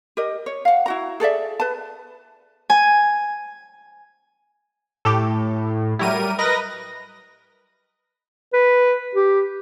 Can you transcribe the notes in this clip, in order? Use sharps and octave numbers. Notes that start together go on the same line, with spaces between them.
G4 A#4 D#5
C#5
F5 F#5
E4 F#4 A#5
G#4 A4 D5 E5
B4 A5
G#5
A2 G4 A4
F#3 G3 E4 A#4 D#7
A#4 B4 D#5 A#6
B4
G4